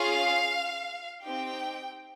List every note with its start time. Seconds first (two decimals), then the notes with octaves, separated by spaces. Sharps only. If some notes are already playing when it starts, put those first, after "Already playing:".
Already playing: C#4 F4 G#4 F5
1.23 C4 D#4 G4 G5